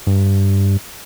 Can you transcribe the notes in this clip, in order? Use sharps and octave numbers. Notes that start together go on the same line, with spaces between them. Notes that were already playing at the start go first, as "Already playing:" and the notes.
G2